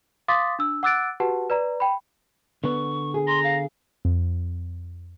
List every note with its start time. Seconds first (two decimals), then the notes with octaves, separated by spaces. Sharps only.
0.28 F5 C6 D6 D#6 A6 B6
0.59 D4 E6
0.83 F#5 D6 E6 F#6 A6 D7
1.20 F#4 G4 B4 F#5 A5
1.50 B4 D5 A#5
1.80 G5 B5
2.64 D3 B3 C#6
3.14 G#4
3.27 A#5 C6
3.44 F5
4.05 F2